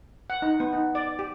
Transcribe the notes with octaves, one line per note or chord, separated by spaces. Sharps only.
F#5
D#4
B3
D#4
D5
G4